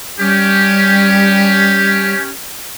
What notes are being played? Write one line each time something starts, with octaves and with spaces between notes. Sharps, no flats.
G3 C#4 G4